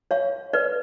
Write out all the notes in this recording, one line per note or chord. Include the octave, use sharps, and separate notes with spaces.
C#5 F5
B4 D5